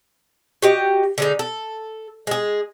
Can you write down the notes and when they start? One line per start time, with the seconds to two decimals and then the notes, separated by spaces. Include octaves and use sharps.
0.62 F#4 G4 D#5
1.18 D3 G#3 D#4
1.39 A4
2.27 G#3 G#4